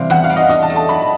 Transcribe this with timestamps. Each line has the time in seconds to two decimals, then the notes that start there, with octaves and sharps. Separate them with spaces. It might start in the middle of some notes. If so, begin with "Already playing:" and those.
Already playing: C3 E3 G3 F5
0.10 E2 F#5
0.24 F5
0.30 G3
0.37 D#5
0.49 D4 D#5
0.63 A5
0.70 A3
0.76 A5
0.89 F#3 B5